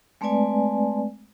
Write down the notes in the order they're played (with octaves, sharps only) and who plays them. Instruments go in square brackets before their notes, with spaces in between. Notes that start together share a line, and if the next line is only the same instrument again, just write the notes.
[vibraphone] G#3 A3 C4 B4 D5 G#5